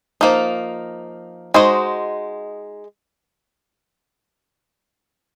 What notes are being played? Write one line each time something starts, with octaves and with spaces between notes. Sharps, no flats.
F3 A#3 D#4
G#3 D#4 F#4 C5 D#5